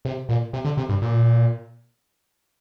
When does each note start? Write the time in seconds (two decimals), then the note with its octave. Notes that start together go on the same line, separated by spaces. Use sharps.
0.05 C3
0.29 A#2
0.53 C3
0.65 D3
0.77 C3
0.89 G2
1.02 A#2